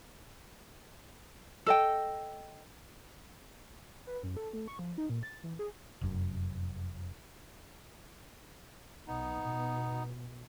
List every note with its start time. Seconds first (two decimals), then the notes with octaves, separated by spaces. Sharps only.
1.66 A4 D#5 G5
4.07 B4
4.23 F#2
4.37 A4
4.53 A3
4.68 C#6
4.79 F3
4.98 D#4
5.09 A#2
5.23 A6
5.44 E3
5.59 G#4
6.01 F1 F#2
9.07 B1 B3 D#4
9.44 B2